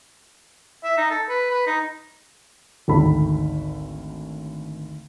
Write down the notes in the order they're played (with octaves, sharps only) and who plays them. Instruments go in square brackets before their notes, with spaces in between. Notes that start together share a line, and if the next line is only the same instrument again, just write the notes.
[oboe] E5
D#4
A4
B4
B4
D#4
[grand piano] G#1 D2 D#3 A4 B5